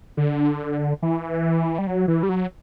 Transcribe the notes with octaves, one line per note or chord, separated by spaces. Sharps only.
D3
E3
G3
F#3
E3
G3
F#3